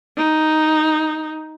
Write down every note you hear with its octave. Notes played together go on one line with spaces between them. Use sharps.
D#4